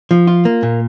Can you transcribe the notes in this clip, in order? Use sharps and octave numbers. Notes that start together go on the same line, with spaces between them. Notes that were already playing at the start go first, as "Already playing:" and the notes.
F3
F4
A#3
A#2